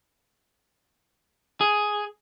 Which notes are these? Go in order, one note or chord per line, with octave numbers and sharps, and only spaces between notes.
G#4